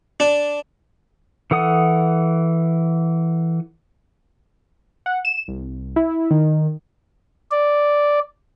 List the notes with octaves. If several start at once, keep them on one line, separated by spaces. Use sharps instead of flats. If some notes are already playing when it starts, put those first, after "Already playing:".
D4
E3 A4 F#5 D#6
F#5
E7
C2
E4
D#3
D5